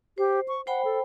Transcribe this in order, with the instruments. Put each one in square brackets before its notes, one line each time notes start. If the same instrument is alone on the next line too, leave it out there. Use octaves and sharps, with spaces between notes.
[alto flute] G4 [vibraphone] C5
[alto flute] C#6
[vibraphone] C5 G5 B5 [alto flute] F#5
[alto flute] A4